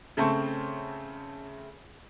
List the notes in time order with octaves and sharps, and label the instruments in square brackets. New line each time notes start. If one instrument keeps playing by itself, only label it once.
[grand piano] C#3 A3 C4 A5 C6 C#6